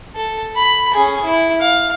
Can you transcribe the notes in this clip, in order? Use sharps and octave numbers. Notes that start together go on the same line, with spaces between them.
A4
B5
C#4 G#4
E4
F5